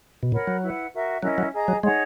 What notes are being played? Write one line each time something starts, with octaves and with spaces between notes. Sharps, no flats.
B2
A#2 A#4 C#5 F#5 B5
F#3
E4 B4 F#5
F#4 A#4 E5
F#3 C#4 E4 A#4 D#5
F#3
G#4 D#5 A#5
F#3
G#3 D#4 G#4 C#5 F#5